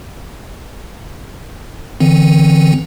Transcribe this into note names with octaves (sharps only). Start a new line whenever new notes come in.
D3 E3 C4